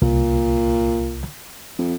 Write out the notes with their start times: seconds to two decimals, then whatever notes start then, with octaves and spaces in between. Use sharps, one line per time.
0.02 C2 A#2
1.78 F2